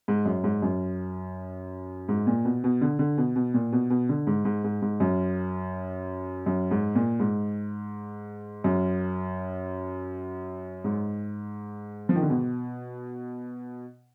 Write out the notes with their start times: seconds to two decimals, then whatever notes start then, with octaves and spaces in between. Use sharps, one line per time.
0.08 G#2
0.26 F#2
0.44 G#2
0.62 F#2
2.09 G#2
2.27 A#2
2.45 B2
2.64 B2
2.81 D3
2.99 D3
3.18 B2
3.36 B2
3.54 A#2
3.72 B2
3.90 B2
4.09 D3
4.27 G#2
4.45 G#2
4.64 G#2
4.82 G#2
5.00 F#2
6.46 F#2
6.71 G#2
6.95 A#2
7.20 G#2
8.64 F#2
10.84 G#2
12.09 F3
12.16 D#3
12.22 D3
12.30 B2